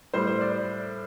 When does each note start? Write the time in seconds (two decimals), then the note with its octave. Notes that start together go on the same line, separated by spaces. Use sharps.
0.14 A2 G3 C5
0.27 C5
0.41 D5